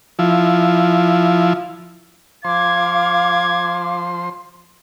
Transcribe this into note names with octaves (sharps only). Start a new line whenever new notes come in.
F3 E4
F3 C5 F5 C6 D6 G#6